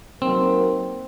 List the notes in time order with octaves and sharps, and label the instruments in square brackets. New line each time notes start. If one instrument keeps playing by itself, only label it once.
[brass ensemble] F#3 A#3 D#4 F#4 A#4 [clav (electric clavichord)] C4